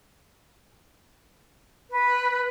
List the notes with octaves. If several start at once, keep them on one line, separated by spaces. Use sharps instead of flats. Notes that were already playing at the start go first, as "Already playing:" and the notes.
B4